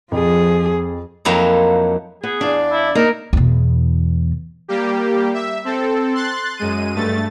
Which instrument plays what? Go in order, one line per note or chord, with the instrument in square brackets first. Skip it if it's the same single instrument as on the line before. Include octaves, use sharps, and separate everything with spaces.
[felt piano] F2 [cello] F3 G#4
[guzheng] F2 F#3 A#3 D#4 E4
[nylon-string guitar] B3 [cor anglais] G#4
[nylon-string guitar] E2 F5 [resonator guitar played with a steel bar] D4 [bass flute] D5
[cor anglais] E4
[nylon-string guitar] A#3 E5 [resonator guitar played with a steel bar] D#4 [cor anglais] A#4
[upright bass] E2 B2
[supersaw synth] G3 A#3 G4
E5
C4 A4
C6 F#6 A6
F#2 G#3 D#7
G2 A3 A6